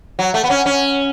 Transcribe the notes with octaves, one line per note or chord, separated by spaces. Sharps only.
F#3
A3
B3
C#4
C#4